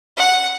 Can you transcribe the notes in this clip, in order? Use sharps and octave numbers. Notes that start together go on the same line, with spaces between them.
F#5